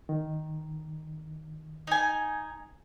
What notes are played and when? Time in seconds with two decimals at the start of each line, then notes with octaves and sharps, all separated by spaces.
0.09 D#3
1.87 D#4 G#5